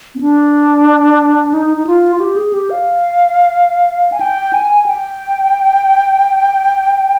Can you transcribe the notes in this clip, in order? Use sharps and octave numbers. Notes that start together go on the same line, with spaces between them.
C4
D4
D#4
D#4
F4
F4
G4
G#4
G4
F5
G#5
G5
G#5
G5